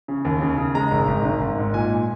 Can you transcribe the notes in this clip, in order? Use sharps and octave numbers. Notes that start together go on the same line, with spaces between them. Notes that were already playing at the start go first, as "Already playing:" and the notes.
C#3
D#2
C#3
C#3
G#3 A#5
G#1
G#1
G#1
G#1
G#2
A#2 G#5